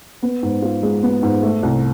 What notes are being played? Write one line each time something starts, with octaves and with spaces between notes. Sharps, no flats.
B3
G#2
F4
G#3
B3
G#2
A3
C2